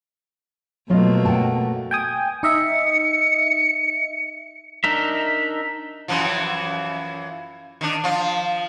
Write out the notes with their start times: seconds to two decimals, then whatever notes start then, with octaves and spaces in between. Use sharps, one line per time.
0.90 B2 F#3 A3 A#3 F4 D#5
1.25 F#5 G5 A5
1.91 G5 G#5 D#6
2.43 D#4 D#5 E5 C#7
4.84 D4 D#4 A#4 E5
6.08 F#2 E3 F3
7.81 D#3 D4
8.04 F3 F4